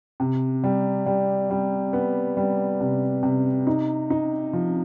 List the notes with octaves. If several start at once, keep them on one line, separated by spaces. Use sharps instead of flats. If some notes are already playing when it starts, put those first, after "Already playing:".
C3
G3
G3
G3
B3
G3
C3
C3
D#4
D#4
F3